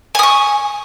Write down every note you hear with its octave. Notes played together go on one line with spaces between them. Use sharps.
G#5 C#6 D#6